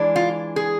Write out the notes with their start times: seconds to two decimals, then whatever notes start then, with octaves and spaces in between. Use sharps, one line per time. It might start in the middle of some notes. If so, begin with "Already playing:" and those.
Already playing: E3 G#3 D4
0.16 F4
0.56 G#4